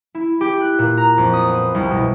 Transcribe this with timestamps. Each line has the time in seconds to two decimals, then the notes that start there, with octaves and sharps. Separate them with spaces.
0.15 E4
0.41 G4
0.61 F#6
0.79 A#2
0.97 A#5
1.18 F2
1.33 D#6
1.47 B3
1.75 C2
1.91 B2